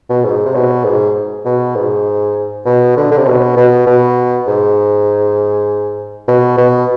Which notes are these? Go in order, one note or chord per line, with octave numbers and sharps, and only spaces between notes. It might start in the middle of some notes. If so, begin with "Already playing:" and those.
B2
G#2
C3
B2
G#2
B2
G#2
B2
D3
D3
C3
B2
B2
B2
G#2
B2
B2